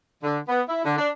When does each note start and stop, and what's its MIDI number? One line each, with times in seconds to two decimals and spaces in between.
0.23 0.39 50
0.48 0.61 59
0.69 0.82 64
0.85 0.95 50
0.98 1.09 62